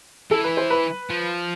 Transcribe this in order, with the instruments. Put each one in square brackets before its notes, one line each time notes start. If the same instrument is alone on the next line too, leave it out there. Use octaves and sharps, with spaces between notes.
[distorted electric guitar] E3 [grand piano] A4
[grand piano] B4
C5
B4
[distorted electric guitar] F3